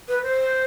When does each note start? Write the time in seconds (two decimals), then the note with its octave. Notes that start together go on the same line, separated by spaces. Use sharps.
0.08 B4
0.23 C5